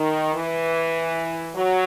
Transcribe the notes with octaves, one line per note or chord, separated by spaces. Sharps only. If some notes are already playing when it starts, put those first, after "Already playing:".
Already playing: D#3
E3
F#3